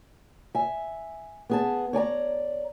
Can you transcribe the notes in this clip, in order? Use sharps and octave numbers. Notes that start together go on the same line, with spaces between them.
E5 G#5
B3 G#4 A5
C#5 D5 G#5 A#5